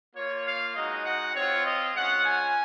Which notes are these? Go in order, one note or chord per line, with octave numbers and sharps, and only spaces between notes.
A#3 F4 C#5
F5
G#3 D#4 F#4 D#5
F#5
C4 F4 C#5
D#5
G#3 C#4 F4 F#5
G#5